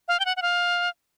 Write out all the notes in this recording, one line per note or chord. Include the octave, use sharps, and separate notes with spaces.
F5
G5
F#5
F#5
F5